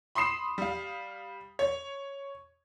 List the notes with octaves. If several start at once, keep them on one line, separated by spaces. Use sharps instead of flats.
B5 C6 D#6 C7 E7
G3 F5
C#5